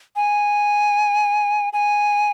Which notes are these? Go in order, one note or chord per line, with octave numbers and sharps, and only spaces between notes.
G#5
G#5